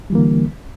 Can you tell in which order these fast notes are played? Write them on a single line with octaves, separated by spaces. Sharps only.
G3 E3 A#3 D3